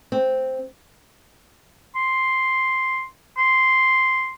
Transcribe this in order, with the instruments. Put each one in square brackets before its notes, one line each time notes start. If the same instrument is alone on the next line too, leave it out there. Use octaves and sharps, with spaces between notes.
[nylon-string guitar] C4
[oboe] C6
C6